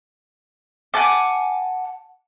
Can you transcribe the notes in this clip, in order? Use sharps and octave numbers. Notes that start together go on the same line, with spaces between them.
F#5 G#5 A5 D6